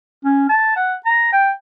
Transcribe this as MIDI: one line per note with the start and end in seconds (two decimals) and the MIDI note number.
0.24 0.49 61
0.49 0.74 81
0.76 0.94 78
1.06 1.28 82
1.33 1.50 79